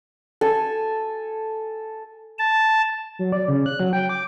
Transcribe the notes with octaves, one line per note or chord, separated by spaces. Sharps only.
A4 G#5
A5
F#3
D5
C#3
F#6
F#3
G5
D6